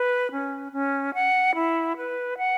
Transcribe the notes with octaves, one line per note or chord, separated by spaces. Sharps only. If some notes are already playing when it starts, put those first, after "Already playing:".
Already playing: B4
C#4
C#4
F#5
E4
B4
F#5